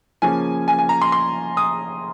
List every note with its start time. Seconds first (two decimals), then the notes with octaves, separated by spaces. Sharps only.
0.22 C#3 F3 A#3 C#4 G#5
0.68 G#5
0.79 G#5
0.89 A#5
1.02 C6
1.12 C6
1.57 D#6